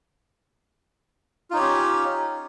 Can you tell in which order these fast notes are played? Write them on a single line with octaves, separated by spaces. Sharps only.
F4 D#4 C#5 G4 C#4